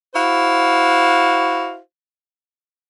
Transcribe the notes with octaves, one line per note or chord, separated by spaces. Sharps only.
E4 F#4 C5 F5